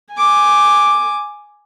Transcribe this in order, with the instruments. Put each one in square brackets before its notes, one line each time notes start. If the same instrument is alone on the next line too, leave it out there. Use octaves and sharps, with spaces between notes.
[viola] G#5 D6